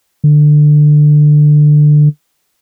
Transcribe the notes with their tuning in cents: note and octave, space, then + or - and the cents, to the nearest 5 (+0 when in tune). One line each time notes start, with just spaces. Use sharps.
D3 +20